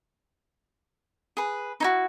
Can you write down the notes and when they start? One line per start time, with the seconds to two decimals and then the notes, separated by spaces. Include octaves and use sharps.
1.37 G#4 B4
1.80 D#4 E4 F#4